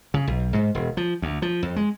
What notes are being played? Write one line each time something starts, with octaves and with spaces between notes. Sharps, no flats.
C#3
B1
G#2
E1
F3
D2
F3
F2
G#3